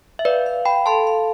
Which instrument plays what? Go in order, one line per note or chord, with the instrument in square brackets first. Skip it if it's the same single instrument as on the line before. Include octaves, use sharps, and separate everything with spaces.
[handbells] E5
[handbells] B4 D5 [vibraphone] F5
[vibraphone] F5
[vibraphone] F5 [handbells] G5 B5
[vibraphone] A4 [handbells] A5 C6
[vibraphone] F5